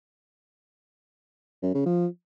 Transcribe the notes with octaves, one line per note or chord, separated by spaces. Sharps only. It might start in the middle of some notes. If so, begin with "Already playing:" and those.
F#2
C#3
F3